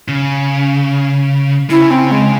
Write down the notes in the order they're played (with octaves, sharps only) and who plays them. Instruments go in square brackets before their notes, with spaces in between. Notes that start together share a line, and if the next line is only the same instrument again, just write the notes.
[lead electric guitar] C#3
[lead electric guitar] C#3 [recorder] E4
[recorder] C4
G#3